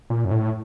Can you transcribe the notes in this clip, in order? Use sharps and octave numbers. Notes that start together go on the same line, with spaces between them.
A#2
F#2
A2